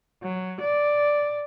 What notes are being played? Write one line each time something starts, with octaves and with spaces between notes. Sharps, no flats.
F#3
D5